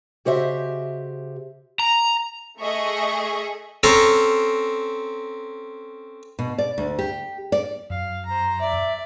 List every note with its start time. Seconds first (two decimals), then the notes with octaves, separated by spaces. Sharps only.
0.25 C#3 F#4 G4 C5 D#5 E5
1.80 A#5
2.60 A3 G#4 D#5 E5 C#6
3.83 C4 C#4 A4 A#5 C6
6.39 B2
6.58 D5
6.78 D2
6.99 G4
7.52 D5
7.90 F#2 F5
8.26 C5 A#5
8.60 D5 E5